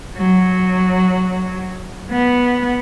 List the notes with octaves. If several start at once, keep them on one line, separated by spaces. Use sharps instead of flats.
F#3
B3